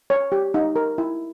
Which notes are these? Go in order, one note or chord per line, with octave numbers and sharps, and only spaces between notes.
C#5
G4
D#4
A#4
E4